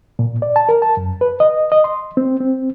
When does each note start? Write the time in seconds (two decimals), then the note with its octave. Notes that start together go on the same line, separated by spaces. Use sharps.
0.19 A#2
0.42 D5
0.56 A5
0.69 A#4
0.82 A5
0.97 F#2
1.21 B4
1.40 D#5
1.72 D#5
1.84 C6
2.17 C4
2.40 C4